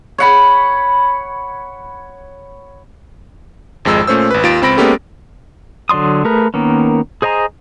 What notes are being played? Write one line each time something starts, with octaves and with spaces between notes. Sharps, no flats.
C#5 F#5 B5
G#1 F2 G#3 E6
A#2 A3 C#4 C5 E6
G#1 B4
D#2 F4 A6 D7
C#2 C4 B5 A#6 D7
G#3 A#3 B3 C#4 G4 A4
D3 F#3 D5 C6 D#6
A3 G#4 A#4 B4
D#3 A#3 B3 C#4
G#4 C5 D#5 G#5 A#5